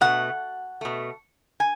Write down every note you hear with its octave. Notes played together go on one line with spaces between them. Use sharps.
B2 A3 F#5
B2 A3
G#5